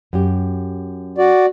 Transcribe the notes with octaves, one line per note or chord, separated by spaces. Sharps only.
F#2 G4
F#4 D5